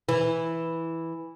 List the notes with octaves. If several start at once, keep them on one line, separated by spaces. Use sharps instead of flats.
E3